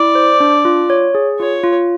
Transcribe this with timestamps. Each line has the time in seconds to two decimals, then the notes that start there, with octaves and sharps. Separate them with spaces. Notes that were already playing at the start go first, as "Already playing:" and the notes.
Already playing: E4 D5
0.15 C5
0.40 D4
0.65 F4
0.90 C#5
1.15 G#4
1.39 F4 C#5
1.64 F4